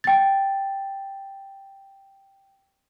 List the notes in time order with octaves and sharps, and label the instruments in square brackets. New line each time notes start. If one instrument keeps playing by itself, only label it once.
[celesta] G5 A6